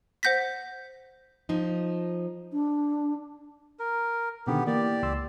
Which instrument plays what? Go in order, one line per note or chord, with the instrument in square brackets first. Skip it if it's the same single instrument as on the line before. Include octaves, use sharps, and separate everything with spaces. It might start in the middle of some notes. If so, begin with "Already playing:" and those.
[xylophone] C5 F#5 G6 A#6 B6
[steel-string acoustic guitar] F3 D#4
[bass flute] D4
[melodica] A#4
[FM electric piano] B2 D3 D#3 [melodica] B3 G4
[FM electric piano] E3 A#3 [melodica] G4 D5
[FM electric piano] C#2 C6 E6